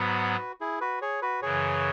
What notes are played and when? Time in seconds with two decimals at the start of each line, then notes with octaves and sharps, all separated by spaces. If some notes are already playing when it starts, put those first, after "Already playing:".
Already playing: G#2 F#3 B3 F#4 B4
0.61 E4 G#4
0.81 F#4 B4
1.02 G#4 C#5
1.22 F#4 B4
1.42 F#2 C#3 E3 G#4 C#5